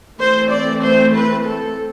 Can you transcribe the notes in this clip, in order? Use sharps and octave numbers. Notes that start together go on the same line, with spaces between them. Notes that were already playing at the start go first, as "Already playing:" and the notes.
E3 A3 C4 C5
D5
C5
B4
A4